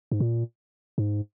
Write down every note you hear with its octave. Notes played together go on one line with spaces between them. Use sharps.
G#2
A#2
G#2